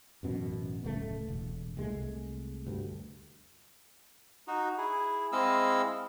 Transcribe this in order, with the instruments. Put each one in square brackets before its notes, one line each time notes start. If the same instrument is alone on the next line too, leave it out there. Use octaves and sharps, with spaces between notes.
[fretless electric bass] A1 F#2 B2
D1 C#2 A3
E1
C2 G#3 A3
D2 G2
[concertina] D#4 F#4
E4 G#4
G#3 C4 E4 D#5 F5 E6